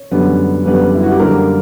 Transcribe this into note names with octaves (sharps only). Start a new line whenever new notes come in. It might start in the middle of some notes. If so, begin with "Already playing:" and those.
Already playing: C#5
F#2 D3 G3 B3
F#2 D3 G3 B3 B4
E4
F#4
G4
F#2 D3 G3 A#3 A#4